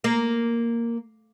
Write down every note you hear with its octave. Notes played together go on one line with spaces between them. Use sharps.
A#3